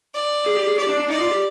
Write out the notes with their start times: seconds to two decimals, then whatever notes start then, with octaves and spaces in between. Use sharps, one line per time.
0.14 D5
0.46 G#4
0.57 G4
0.67 G#4
0.78 G4 D5
0.89 D4
0.99 D4
1.10 D#4 D5
1.21 F4
1.31 G4